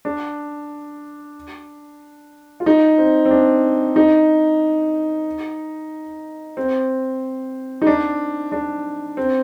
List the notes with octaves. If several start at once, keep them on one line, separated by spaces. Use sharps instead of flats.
D4
F4
D#4
C4
C4
D4
D#4
C4
D#4
D4
D4
C4